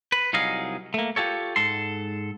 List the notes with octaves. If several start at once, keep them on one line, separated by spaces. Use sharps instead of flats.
B4
C2 F#3 D#4 G#4 D#5 F5
A3 A#3
F4 G4 A4 C#5
G#2 A4 C6